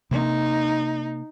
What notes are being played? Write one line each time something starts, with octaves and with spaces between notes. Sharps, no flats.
C3 A#3 D#4